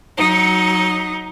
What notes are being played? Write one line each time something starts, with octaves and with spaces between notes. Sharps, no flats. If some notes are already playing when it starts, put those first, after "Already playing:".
F#3 D#4